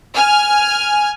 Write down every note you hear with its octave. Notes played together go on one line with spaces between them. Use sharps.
G#5 F6